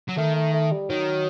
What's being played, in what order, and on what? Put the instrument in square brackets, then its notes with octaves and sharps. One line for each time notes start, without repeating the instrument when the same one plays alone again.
[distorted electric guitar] F#3
[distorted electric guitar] D#3 [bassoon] A3
[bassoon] A3
A3
G3
[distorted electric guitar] D#3 [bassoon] F#3